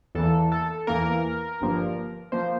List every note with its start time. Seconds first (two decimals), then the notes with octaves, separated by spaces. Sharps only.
0.15 E2 E3 A#3 A4
0.52 A4
0.87 E2 E3 A#3 A#4
1.60 G1 G2 F3 A#3
2.32 F3 A#3 C5